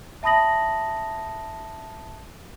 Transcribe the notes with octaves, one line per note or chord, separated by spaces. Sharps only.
E5 A5 B5 D#6 A#6 F#7